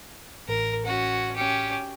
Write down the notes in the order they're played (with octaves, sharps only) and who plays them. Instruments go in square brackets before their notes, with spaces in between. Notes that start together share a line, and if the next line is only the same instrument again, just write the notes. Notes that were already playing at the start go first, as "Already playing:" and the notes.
[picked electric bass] A1 [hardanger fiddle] A#4
[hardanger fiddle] C#4 F#4
C#4 G4